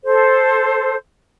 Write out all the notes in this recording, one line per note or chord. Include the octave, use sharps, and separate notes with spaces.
A4 C5